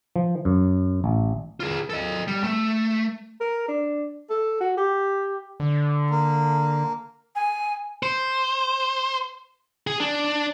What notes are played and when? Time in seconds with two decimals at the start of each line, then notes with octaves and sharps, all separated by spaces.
0.16 F3
0.45 F#2
1.04 A1
1.60 F4 G#4
1.90 A4 D#5
2.28 G3
2.44 A3
3.41 A#4
3.68 D4
4.30 A4
4.61 F#4
4.78 G4
5.60 D3
6.10 A#3
7.35 G#5
8.03 C5
9.87 G#4
10.00 D4